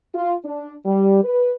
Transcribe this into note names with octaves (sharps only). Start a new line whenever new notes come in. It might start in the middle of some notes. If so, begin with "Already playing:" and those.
F4
D4
G3
B4